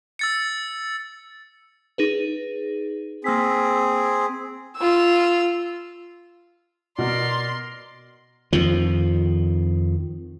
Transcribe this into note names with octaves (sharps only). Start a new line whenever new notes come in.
E6 A6 C#7
D#4 G#4 B4
A#3 C4 G#4 E6 B6
F4 E6
B2 A#4 D5 C6
F2 D#3 F3